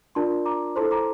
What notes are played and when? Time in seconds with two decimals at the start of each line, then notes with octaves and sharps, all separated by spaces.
0.15 D4 F4 A#4 D5 A5 C6
0.45 A#5 D6
0.76 E4 A4 C5 A5 C6
0.91 A#5 D6